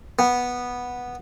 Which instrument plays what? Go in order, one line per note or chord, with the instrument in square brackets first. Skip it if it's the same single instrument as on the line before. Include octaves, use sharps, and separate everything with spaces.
[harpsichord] B3